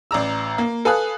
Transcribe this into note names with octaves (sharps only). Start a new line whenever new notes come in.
A1 D5 A#5 E6
A#3
A4 B4 F5 G#5 D#6 F#6